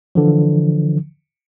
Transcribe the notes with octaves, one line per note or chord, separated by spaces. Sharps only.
D3 E3 F3